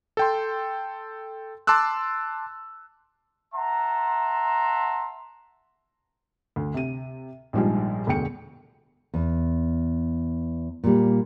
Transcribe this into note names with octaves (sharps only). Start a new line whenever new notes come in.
A4 G5 C6
A5 C6 D6 E6 F#6
E5 F#5 A5 A#5 C6
D2
C3 D#7
A#1 G#2 F3 G3 G#3
E1 D2 G#4 G5 C#7
E2
A#2 G3